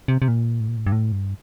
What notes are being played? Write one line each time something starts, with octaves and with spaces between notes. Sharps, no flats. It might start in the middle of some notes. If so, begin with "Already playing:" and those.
C3
C3
A#2
A2
A#2
A2
G2
A2
G2